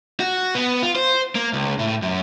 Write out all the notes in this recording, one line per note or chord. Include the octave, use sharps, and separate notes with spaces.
F#4
B3
F4
C5
A#3
C#2
A2
F#2